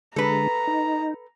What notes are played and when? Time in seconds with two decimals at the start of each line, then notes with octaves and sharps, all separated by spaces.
0.16 D3 G#3 A4 B4 A#5
0.67 D#4